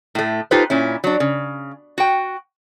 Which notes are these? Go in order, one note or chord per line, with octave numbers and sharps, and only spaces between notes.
A2 A3
D#4 F4 G4 A4 B4 C5
A#2 C#4 E4
F#3 D4
C#3
F#4 G5